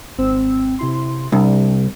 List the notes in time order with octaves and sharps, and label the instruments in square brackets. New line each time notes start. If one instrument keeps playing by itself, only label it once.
[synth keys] G#1 C4 E6
C3 E4 C6
[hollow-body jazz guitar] C2 [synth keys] G3 D4